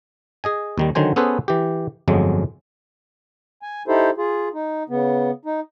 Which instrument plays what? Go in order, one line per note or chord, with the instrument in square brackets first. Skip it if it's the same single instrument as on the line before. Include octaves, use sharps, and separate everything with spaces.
[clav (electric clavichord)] G#4 D#5 G#5
D#2 D#3 G3
D3 D#3 F#3 C5 G#5
B3 C#4 G#4 A4 B4 C5
E3 G4
G1 F2 F3 F#3 G#3
[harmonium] G#5
D#4 E4 G4 A4 C5
F4 G#4
D#4
C#3 B3
D#4